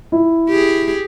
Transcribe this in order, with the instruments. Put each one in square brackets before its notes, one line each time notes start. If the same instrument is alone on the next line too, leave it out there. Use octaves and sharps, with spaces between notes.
[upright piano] E4
[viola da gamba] G4 G#4